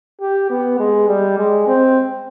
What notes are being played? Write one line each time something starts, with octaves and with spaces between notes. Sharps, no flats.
G4
B3
G#3
G3
G#3
C4